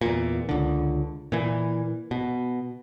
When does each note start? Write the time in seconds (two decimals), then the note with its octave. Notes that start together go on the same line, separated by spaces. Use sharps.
0.01 E2 A#2
0.49 C#2 D3
1.32 A#2 E3
2.11 B2